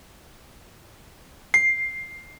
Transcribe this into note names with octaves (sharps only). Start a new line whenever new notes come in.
C7